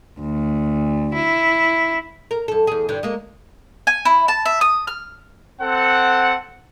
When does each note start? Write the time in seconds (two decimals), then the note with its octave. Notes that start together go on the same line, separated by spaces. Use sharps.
0.20 D2
1.14 E4
2.31 A#4
2.48 F#2 A4
2.67 E2 G#4
2.89 G2 D3
3.03 G#3 A#3
3.87 G#5
4.05 E4
4.28 A5
4.46 E5
4.61 D#6
4.87 F6
5.61 C4 A4 F#5